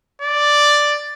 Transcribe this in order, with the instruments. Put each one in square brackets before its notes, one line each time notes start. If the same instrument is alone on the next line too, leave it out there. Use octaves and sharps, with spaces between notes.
[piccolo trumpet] D5